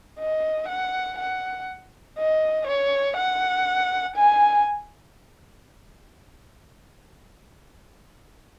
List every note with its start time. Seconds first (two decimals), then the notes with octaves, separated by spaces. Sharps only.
0.19 D#5
0.69 F#5
1.19 F#5
2.19 D#5
2.67 C#5
3.17 F#5
4.17 G#5